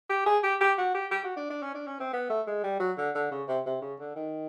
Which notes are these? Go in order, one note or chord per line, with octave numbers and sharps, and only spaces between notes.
G4
G#4
G4
G4
F#4
G4
G4
F#4
D4
D4
C#4
D4
C#4
C4
B3
A3
G#3
G3
F#3
D3
D3
C#3
C3
C3
C#3
D3
D#3